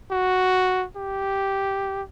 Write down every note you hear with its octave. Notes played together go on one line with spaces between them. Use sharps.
F#4
G4